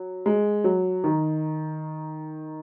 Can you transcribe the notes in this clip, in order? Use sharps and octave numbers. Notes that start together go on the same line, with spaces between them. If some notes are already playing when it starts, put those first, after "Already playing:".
Already playing: F#3
G#3
F#3
D#3